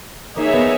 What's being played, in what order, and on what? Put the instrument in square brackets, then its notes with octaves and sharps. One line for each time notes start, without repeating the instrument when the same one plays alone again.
[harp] A#3 [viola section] D#4 G#4 C#5 E5
[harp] B3